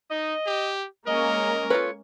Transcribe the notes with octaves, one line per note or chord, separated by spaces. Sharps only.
D#4 D#5
G4
G#3 A#3 C#4 A#4 D#5
F4 A4 B4 C#5